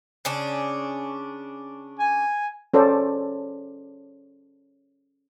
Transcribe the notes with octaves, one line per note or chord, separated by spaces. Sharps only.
C#3 C#4 D4
G#5
C#4 A4 C5 D5